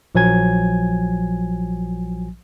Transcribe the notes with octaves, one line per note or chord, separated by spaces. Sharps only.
A#1 F3 F#3 G#5 G#6